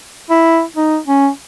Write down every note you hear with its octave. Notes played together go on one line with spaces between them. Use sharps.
E4
D#4
C#4